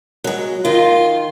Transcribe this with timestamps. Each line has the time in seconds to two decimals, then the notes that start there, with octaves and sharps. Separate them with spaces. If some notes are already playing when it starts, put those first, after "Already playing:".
0.24 F#3 G#3
0.65 D#3 F4